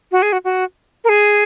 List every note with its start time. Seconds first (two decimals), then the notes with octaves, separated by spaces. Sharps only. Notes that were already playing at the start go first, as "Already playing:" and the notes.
0.12 F#4
0.22 G#4
0.33 F#4
0.45 F#4
1.04 A#4
1.09 G#4